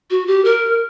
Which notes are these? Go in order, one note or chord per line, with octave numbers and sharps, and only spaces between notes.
F#4
G4
A#4